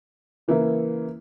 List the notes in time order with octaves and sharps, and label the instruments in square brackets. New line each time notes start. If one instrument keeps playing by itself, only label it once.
[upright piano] C#3 E3 A#3 E4